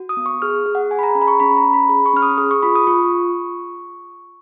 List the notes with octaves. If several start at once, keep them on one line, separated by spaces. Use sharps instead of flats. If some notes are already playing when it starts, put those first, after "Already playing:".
Already playing: F#4
D#6
B3
C#6
G#4 F6
G#4
F#5
G#4 G#5
B5
A#5
C#4 A#5
B5
C#6
C#4 B5
A#5
C#4
B5
G#4 B5
C#6
C#4 F6
D#6
G#4 D#6
C#6
F4 B5
D#6
F4 C#6